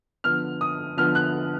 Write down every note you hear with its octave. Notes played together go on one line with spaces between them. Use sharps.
D3 F3 B3 F6
D#6
D3 F3 B3 F6
F#6